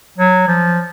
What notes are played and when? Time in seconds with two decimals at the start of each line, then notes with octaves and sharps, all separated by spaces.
0.18 F#3
0.48 F3